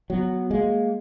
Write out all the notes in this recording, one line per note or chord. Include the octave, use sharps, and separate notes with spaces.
F#3 B3
G#3 A#3